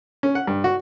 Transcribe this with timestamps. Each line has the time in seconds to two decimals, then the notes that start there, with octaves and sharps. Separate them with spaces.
0.23 C#4
0.35 F#5
0.47 G2
0.64 F#4